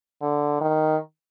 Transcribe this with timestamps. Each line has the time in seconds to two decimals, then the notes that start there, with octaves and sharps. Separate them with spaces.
0.22 D3
0.61 D#3